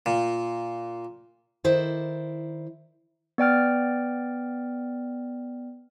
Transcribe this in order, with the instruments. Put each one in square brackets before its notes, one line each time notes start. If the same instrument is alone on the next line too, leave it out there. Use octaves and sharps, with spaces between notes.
[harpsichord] A#2
[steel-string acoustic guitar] D#3 E4 C5 D5
[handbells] B3 D5 G5 F6